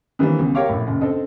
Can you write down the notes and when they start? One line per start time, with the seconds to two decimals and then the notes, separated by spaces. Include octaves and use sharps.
0.19 D#3 E3 G3 A#3 C4 D4
0.39 C#2 B2
0.55 G4 A#4 C#5 F5 D6
0.69 A#1 A2
0.87 F#1 D#2
1.01 C4 D4 A4 D#5